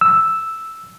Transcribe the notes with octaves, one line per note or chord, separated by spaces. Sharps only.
E6